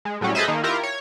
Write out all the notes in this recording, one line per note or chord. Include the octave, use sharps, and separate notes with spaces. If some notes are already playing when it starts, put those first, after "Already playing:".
G#3
A2 F#3 G3 C#4
G#4 A4 B4 C5 D#5 E5
D#3 A#3 D#4
E4 F4 G4 A#4
C#5